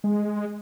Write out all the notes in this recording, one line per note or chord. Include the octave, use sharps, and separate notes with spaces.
G#3